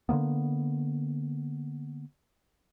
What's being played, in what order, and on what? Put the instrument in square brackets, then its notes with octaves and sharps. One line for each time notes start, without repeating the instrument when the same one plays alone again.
[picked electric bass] D3 F#3 A#3 B3